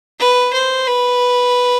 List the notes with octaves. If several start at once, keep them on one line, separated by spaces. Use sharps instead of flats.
B4
C5
B4